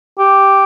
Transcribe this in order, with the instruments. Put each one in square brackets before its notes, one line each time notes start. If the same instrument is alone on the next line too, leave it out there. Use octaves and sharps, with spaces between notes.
[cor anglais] G4